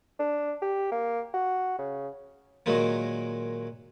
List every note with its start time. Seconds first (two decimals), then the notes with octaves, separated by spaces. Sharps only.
0.19 D4
0.62 G4
0.92 A#3
1.34 F#4
1.78 C#3
2.66 A#2 D#3 F#3 G#3 A#3